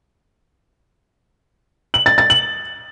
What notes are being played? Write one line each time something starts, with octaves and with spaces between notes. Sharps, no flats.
F#7
A6
A6
F#7